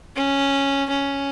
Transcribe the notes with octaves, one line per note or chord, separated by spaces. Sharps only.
C#4
C#4